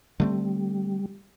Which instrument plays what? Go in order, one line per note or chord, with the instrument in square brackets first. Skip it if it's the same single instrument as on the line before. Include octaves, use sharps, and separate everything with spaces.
[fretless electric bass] D3 A3 C4 [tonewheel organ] G3